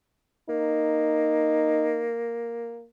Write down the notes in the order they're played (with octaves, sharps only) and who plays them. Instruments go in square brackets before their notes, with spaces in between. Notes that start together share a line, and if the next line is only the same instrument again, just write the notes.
[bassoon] A#3 [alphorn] D#4